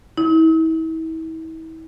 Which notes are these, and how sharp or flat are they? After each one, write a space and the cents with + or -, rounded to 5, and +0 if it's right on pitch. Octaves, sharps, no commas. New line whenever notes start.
E4 -40